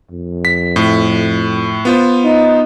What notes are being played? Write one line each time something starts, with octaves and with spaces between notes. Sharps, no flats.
F2
B6
A2
B3 F4 C5
D#4